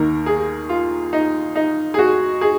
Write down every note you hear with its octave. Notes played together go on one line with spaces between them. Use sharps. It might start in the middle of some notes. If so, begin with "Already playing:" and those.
Already playing: D#2 D#3 A#3 A#4
G#4
F4
D#4
D#4
G#4
F#4
G#4